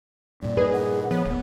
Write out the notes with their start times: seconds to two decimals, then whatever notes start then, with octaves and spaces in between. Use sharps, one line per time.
0.42 G2 A#2 D5
0.57 D#4 G#4 A#4 B4
0.73 F#5
1.11 F3 B3 C#5
1.25 D#1 A#3 B3